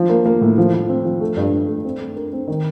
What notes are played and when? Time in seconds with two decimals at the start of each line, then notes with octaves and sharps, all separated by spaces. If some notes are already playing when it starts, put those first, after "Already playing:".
Already playing: F3
0.10 A#3
0.26 A#3
0.41 A2
0.58 F3
0.74 F3
0.89 C4
1.05 F3
1.21 A3
1.37 G2
1.53 G2
1.68 A3
1.85 C4
2.00 A3
2.16 A#4
2.33 C4
2.48 D#3